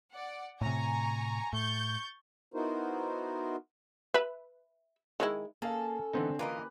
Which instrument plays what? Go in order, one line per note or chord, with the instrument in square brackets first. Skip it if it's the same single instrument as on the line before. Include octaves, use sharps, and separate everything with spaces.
[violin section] D5 F#5
[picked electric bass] A2 C3 [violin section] G#5 A#5 C#6
[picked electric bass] A2 [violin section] C#6 G6 A6
[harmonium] B3 D#4 E4 F#4 A#4 C5
[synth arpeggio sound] B4 [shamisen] E5 B5
[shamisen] D#3 G#3 E4
[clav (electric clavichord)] A#3 G#4 [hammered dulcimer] C#4 [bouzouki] A4 [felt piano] F5 A5
[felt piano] D3 C4 D4 [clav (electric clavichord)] E3 B3 D#4
[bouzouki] E3 A#4 D#5 [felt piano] A#3 [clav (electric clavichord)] F4 [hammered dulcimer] G4 B4 A#5